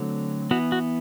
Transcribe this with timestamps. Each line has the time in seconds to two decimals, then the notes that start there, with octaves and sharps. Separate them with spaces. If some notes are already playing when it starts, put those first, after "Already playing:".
Already playing: D3 F#3 A3 C4
0.51 E3 B3 F#4
0.72 F#4